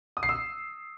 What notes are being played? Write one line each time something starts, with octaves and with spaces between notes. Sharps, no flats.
D#6
C7
E6